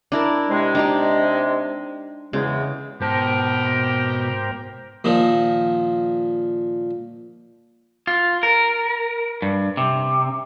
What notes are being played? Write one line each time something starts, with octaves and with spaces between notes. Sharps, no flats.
D4 E4 A#4
C3 G#3
D4 D#4 G4
E2 C#3 G#3
G#2 B2 G4 A#4 C5 G5 A5
A#2 D#3 F3
F4
A#4
G2
C3